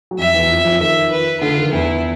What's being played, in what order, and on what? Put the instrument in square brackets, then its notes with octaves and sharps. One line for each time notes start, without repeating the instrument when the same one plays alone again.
[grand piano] F#3
[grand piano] F2 F3 [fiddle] E5
[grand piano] E2 E3
F2 F3
F2 F3
[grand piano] D#3 [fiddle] E5
[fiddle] B4
[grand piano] D3 [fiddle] F4
[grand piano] D#3
F3
[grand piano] E2 E3 [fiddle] E4